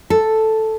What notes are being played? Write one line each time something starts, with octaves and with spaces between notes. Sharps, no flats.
A4